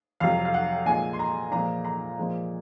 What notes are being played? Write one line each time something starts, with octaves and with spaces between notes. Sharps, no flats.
F2 C3 F#3 F5
F5
F#5
A#2 F3 G#3 G#5
C6
A#5
A#2 F3 G#3 A#5
A#5
A#2 F3 G#3